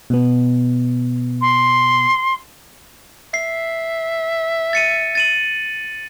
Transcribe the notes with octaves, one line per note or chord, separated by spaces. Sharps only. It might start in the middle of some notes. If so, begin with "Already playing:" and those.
B2 B3
C6
E5 C7
A6 C#7 D#7
A6 D#7 F#7